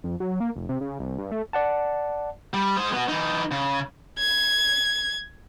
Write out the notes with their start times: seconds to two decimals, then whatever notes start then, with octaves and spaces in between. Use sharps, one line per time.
0.04 F2
0.20 F#3
0.40 A#3
0.56 F1
0.69 C3
0.81 C#3
0.99 C2
1.18 G2
1.31 A3
1.53 D5 F#5 A5
2.54 G3
2.76 G#3 C5
2.93 B3 F#4
3.09 E3 D#4
3.51 C#3
4.19 G#6